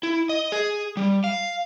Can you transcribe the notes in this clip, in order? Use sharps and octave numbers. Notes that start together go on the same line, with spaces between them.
E4
D#5
G#4
G3
F5